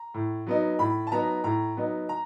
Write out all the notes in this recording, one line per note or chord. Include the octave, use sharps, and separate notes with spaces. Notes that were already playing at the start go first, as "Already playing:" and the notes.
Already playing: A#5
A2
F#3 B3 D#4
A2 B5
A5
F#3 B3 D#4 A#5
A2 A#5
F#3 B3 D#4
A#5